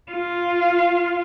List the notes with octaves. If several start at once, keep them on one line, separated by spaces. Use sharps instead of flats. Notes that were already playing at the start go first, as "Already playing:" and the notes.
F4